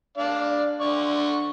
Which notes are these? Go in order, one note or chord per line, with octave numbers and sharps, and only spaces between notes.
D4 D5 F5
D3 D5 C#6